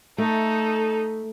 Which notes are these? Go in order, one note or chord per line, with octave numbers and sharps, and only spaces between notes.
A3 D#4 A4